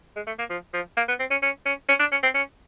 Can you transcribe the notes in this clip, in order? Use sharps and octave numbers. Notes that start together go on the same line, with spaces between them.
G#3
A3
A#3
F3
F3
A#3
B3
C4
C#4
C#4
C#4
C#4
D4
C#4
C4
C#4